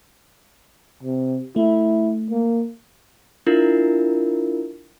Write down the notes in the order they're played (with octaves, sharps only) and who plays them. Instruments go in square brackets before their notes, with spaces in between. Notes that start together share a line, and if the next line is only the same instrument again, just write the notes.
[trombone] C3
[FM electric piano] A3 [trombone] E4
[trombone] A#3
[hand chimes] D4 E4 F4 A#4